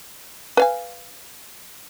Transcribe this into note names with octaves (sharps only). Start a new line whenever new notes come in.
B4 F5 G#5